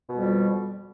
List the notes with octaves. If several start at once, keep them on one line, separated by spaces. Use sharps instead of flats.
F2 B2 G3